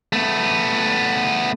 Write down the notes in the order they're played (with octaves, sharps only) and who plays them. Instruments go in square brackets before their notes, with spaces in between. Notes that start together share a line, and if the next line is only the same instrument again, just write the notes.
[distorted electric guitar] A3 B3